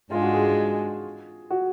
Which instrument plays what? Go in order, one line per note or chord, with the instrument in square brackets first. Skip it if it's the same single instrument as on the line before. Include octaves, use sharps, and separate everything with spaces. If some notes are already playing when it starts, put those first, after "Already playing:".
[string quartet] G#2 G#3 D4 [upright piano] F4
[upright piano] F#4
G#4
G#4
F#4